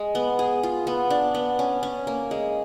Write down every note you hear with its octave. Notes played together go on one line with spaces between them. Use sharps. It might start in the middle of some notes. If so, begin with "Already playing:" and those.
Already playing: G#3
B3
G#4
F4
B3
D4
B3
C#4
C#4
A#3
G#3